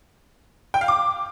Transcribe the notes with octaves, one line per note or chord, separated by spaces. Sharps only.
G5
F5
D6